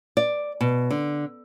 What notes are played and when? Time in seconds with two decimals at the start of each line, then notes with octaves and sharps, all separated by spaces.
0.17 D5
0.61 B2
0.91 D3